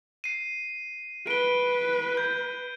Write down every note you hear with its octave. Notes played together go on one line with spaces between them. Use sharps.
C7 D#7
B4 D7 G7
G6